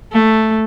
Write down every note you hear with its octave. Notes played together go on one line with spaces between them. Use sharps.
A3